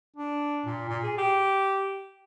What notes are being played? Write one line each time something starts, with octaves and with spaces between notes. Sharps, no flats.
D4
A#2
A#2
G#4
G4